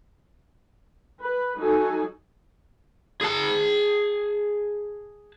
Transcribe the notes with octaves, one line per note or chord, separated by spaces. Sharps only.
B4
F#3 D#4 F#4 A4 G#5
G#4 A5